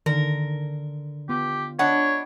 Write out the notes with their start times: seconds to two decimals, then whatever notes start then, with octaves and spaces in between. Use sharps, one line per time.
0.06 D3 D#3 A#4
1.29 B3 F4 G4
1.79 D4 C#5 D#5 F#5 B5 B6